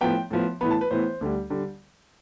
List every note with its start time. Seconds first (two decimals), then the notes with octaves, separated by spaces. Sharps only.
0.01 A2 F3 B3 G5
0.31 A2 F3 B3
0.61 A2 E3 B3 B5
0.71 A5
0.81 B4
0.91 A2 E3 B3 C5
1.21 D2 D3 G3
1.50 D3 G3